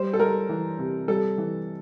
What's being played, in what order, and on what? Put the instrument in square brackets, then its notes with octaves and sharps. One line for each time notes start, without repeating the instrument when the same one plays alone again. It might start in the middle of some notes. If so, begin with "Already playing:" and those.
Already playing: [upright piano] G3 C5
A4
G3 A#4
E3
C3
G3 A4
E3